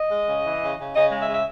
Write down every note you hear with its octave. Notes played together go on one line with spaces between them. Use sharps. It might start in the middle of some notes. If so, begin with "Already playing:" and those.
Already playing: D#5
G#3
C#3
E3
C#3
C#3
C#3 D#5
G#3
E5
C#3
E5